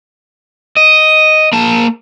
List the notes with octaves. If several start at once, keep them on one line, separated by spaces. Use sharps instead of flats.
D#5
A#3 A5